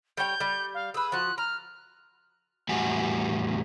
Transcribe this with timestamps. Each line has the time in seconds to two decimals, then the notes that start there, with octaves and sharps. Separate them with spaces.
0.17 G3 C#5 G5 G6
0.40 G3
0.75 F5
0.94 G#4 B4 E6
1.12 F3 F#4 F#6
1.38 A#5 F6
2.69 E2 A2 G3 F#4 G#5